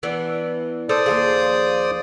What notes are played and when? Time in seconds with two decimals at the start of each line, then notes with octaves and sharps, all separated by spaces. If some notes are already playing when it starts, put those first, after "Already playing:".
0.03 E3 B3 D4
0.89 A4 C5 D5 D#6
1.06 D#2 F3 G#4